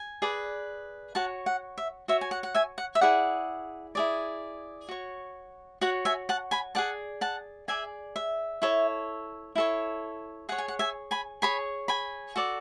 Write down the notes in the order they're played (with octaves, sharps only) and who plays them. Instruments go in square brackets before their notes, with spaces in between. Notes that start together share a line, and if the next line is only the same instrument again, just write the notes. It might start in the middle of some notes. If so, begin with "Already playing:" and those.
Already playing: [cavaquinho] G#5
G#4 B4 D5
F#4 C#5 F#5 A5
F#5
E5
F#4 C#5 E5
G#5
F#5
F#5
E5 G#5
F#5
E5
E4 G#4 D5 F#5
E4 G#4 D5
F#4 C#5
F#4 C#5 F#5
E5 G#5
F#5 A5
G#5 B5
G#4 D5 F#5 A5
F#5 A5
G#4 D5 E5 G#5
E5
E4 A4 C#5
E4 A4 C#5
G#4 C#5 F#5
G#5
F#5
E5 G#5
G#5 B5
G#4 C#5 G#5 B5
G#5 B5
F#4 A4 D5